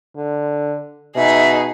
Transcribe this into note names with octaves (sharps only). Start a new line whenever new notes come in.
D3
B2 D#4 G#4 E5